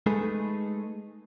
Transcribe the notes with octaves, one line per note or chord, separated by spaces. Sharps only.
G#3 A3 D#4 G#4 A4 B4